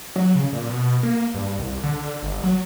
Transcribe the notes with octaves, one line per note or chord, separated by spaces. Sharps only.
F#3
C#3
A#2
B2
A#3
G2
C2
D3
G1
F#3